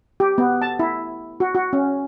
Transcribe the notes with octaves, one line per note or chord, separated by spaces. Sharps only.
G4
B3
A5
E4
F#4
F#4
C#4